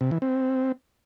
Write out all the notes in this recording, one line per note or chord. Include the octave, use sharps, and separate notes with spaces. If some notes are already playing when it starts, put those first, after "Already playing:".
C3
E3
C4